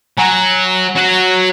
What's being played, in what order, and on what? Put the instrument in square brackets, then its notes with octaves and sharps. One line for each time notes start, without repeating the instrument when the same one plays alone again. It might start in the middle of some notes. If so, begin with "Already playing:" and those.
[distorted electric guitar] F#3 [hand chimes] G#5 A#5
[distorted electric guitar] F#3 F#4